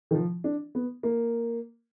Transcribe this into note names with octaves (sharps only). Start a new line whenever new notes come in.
D#3
F3
D4
B3
A#3